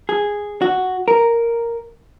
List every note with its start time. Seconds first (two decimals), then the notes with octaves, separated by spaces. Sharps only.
0.09 G#4
0.62 F#4
1.08 A#4